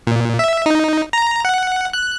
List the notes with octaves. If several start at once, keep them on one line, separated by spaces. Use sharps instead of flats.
A#2
E5
D#4
A#5
F#5
F#6